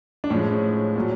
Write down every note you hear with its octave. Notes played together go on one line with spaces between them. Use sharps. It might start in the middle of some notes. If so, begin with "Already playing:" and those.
D4
A2 F3 G#3 C#4
A#2 F#3